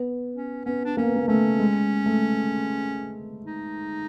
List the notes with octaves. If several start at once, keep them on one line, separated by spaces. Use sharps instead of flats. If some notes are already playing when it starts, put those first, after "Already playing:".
Already playing: B3
C#4
B3 C#4
D4
A#3 C#4
B3
A#3
A3 C#4
G#3
A3
D#4